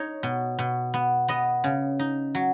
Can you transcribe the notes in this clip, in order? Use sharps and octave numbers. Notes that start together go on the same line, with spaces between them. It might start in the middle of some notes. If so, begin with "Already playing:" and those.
Already playing: D#4 C#5
B2
B2
B3
B3 D#5
C#3
D#4
F#3